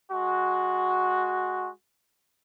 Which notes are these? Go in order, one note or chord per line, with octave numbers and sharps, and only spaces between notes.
G#3 F#4